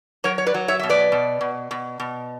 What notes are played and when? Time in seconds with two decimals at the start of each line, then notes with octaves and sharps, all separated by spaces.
0.24 F#3 A#4 C#5
0.38 C#5
0.46 B4 D5
0.54 F#3
0.68 C#5 E5
0.79 B2 E5
0.89 B4 D5
1.12 B2
1.41 B2
1.71 B2
2.00 B2